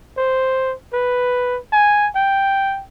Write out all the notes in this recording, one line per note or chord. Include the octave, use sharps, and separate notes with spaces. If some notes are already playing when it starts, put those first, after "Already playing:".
C5
B4
G#5
G5